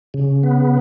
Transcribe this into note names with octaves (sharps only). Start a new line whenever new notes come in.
C#3
B3